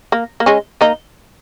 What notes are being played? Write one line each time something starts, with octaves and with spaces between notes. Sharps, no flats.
A#3
A#3
G#3 C#4
A#3 D#4